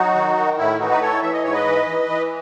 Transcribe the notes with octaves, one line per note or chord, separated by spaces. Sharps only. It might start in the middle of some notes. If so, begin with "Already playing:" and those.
Already playing: F#3 D#4 F#4
D#3
D#3
A2 E4
E3 D#4 F#4
B4
A2 A4 C#5
E3 E5
D#5
G#2 C#5
B4 D#5
E3
E3
E3